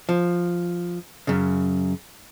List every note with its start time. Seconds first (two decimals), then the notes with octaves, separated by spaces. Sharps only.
0.09 F3
1.27 F#2 C#3